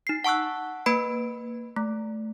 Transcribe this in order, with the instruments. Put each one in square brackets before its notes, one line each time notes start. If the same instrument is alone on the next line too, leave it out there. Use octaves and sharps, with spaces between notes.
[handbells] D#4 C7
F#5 A5 C#6 E6 F#6
A#3 B4 B5 D7
A3